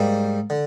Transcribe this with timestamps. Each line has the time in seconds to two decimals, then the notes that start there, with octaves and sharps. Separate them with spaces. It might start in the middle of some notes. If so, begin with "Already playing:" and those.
Already playing: G#2 G3 A#3
0.50 D3